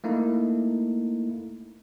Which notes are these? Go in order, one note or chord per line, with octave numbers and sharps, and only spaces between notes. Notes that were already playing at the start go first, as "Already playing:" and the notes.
A3 A#3 D#4 E4